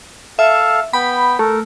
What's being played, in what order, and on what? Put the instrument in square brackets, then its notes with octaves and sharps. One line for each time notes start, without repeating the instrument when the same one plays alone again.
[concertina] A4 F5 [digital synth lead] E5
[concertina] B3 G5 [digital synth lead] B5
[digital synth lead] A3 [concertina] A4 A#4